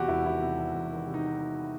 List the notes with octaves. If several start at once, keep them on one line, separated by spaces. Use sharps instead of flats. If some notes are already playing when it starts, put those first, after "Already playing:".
Already playing: E2 C3 F#4 G4
E1 E4
D#3 E4
C3
E2
E1
D#3
C3
D#4